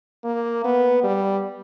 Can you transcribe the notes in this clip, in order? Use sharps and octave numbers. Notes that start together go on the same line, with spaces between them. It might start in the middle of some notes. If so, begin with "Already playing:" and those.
A#3
B3
G3